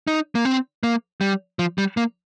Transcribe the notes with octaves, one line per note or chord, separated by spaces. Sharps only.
D#4
A#3
C4
A#3
G3
F3
G3
A#3